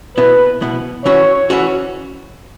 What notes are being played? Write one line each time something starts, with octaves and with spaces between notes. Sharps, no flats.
B2 B3 E4 B4
B2 B3 E4
E3 C#4 F#4 C#5
E3 C#4 F#4